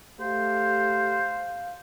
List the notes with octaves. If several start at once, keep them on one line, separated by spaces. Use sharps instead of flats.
A3 G4 C5 F5